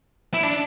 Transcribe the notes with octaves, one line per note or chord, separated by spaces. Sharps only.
E4
D4